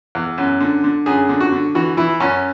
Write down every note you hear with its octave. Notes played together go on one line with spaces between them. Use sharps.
E2
F#2
D3
D3
F#2 G#4
D3
F#4
D3
E3 F#4
E3 E4
F#2 C#4